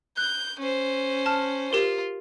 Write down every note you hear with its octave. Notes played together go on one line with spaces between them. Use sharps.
F#6 G6
C#4 C5
A5 F6
F4 G4 A#4